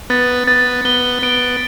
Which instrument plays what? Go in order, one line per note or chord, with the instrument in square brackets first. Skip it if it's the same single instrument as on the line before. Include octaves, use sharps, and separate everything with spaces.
[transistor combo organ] B3 [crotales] A6
[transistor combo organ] B3 [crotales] A6
[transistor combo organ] B3 [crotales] G7
[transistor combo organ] B3 [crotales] D7